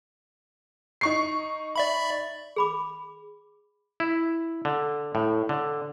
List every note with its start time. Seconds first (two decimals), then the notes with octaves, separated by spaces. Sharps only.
1.01 D#4 C#6 C7
1.76 D5 E5 B5
2.56 G#4 B5 D6
4.00 E4
4.65 D3
5.15 A2
5.49 D3